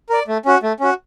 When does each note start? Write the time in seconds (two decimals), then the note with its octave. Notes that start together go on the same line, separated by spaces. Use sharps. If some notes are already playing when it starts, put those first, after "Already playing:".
0.09 A#4 D5
0.28 A3
0.45 C#4 F#4
0.63 A3
0.80 C#4 F#4